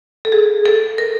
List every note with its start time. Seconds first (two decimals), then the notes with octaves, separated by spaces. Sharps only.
0.25 A4
0.32 G#4
0.66 A4
0.98 A#4